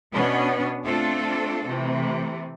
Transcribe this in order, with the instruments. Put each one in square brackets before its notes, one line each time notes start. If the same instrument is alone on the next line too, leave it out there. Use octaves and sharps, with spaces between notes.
[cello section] B2 B3 C#4 D4
A3 C4 D4 F4 A4
C3 E3 A3